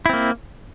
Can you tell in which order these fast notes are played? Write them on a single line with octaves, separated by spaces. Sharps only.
E4 C4 A#3